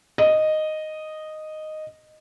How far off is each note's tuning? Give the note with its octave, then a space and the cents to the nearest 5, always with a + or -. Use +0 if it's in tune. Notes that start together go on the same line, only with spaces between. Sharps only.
D#5 -5